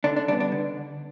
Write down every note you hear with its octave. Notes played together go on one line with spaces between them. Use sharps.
D3 D4
D4
G3 B3 D4
D4
D3